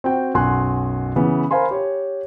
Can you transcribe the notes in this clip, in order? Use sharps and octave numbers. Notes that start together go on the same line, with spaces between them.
C4 F#4 G5
B1 F#2 F#4 G#5 C6 F#6
C#3 E3 B3
A#4 C5 F5 G#5 B5 C6
G4 C#5